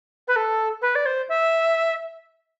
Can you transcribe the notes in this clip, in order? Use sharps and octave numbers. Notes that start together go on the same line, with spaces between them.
B4
A4
B4
D5
C5
E5